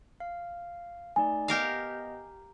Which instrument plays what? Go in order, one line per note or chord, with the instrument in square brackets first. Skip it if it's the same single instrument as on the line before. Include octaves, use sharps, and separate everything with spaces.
[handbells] F5
[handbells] A3 D#4 D5 [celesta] G#5
[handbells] B3 D#5 [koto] G4 A#4 F5